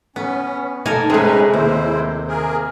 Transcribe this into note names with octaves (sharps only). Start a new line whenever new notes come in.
B3 C#4
A#3 D#4 A4 A#4 G#5
C3 G#3 C#4 D#4 G#4 B4
D#2 G#3 E4 C5
A#3 G#4 A#4